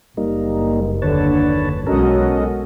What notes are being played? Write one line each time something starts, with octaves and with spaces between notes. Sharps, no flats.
F#1 G3 A#3 D#4
D#2 D3 B4 C#5 A5
B1 G#3 C#4 F#4 A4 A#4 D#5